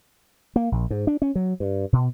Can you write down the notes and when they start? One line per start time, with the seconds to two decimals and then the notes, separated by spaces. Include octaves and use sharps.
0.56 A#3
0.72 A#1
0.90 G#2
1.07 D4
1.22 C#4
1.35 F#3
1.60 G2
1.93 B2